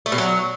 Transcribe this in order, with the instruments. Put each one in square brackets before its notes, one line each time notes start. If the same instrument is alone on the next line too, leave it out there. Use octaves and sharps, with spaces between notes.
[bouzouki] A3
B2
F#3